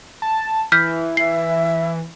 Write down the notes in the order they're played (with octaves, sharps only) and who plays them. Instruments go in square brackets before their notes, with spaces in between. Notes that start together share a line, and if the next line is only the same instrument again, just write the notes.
[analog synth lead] A5
[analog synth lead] E3 [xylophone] F6 G6 B6
[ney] E5 [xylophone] C7